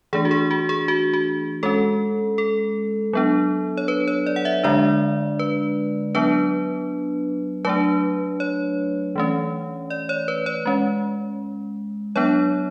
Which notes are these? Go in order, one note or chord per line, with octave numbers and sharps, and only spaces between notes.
E3 A3 D4 G#4
F#4
G#4
F#4
G#4
F#4
F#4
G#3 C#4 A4
A4
F#3 B3 D4
C#5
B4
C#5
D5
F#5
E5
D3 G#3 D4 D5
B4
F#3 B3 D4 B4
F#3 A3 D4 B4
C#5
E3 A3 C#4
D5
C#5
B4
C#5
G#3 C#4
F#3 B3 D4 C#5